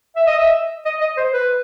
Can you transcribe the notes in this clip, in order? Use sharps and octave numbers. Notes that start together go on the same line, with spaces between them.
E5
D#5
E5
D#5
D#5
C5
B4